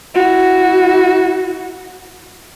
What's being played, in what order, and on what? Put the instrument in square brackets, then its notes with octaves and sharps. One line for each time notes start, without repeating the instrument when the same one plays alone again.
[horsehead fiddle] E4 F#4